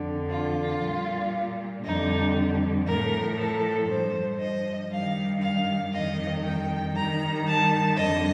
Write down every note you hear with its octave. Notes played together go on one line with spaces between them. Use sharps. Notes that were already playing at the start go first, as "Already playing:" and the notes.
Already playing: F2 D3 F3
F4
A#2 G3
F2 D3 G3 D#4
A2 F3 A#4
A4
G2 F3 C5
D#5
G2 D#3 G3 F5
F5
F2 D#3 G3 D#5
G5
G2 D#3 G3 A#5
A5
F2 D3 G3 D#5